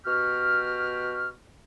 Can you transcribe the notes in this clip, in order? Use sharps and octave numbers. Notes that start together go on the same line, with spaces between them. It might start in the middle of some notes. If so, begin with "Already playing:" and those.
B2 F#4 G4 F6